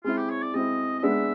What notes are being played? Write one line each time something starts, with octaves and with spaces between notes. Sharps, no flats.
G#3 C4 E4 F4
G4
C#5
D5
G#3 C4 E4 D#5
D#5
G#3 B3 D4 E5